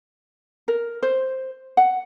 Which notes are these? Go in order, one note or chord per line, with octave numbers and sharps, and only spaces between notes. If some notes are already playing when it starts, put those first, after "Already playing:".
A#4
C5
F#5